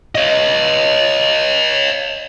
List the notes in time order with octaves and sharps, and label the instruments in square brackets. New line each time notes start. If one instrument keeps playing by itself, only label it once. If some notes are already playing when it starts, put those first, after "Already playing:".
[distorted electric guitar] C#5 D#5